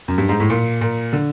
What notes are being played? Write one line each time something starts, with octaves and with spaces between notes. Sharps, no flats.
F#2
G2
G#2
A2
A#2
A#2
D3